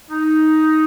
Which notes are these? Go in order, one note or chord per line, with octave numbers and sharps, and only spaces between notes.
D#4